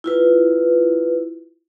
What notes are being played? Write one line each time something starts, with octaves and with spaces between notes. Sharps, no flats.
E4 F4 B4